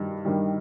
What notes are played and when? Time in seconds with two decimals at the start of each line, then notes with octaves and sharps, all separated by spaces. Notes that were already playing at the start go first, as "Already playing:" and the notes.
Already playing: G2 D#3 G3
0.25 G2 D#3 G3